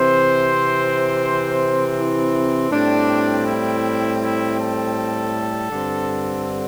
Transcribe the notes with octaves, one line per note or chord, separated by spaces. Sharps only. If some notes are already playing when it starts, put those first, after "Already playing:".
Already playing: C3 E3 C4 C5
E4
A2 G3 C4 D4
E4
E4
A4
G2 D3 C4